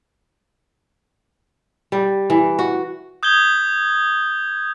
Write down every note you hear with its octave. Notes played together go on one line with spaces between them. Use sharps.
G3
E3
F#4
D#6 G6 G#6 G7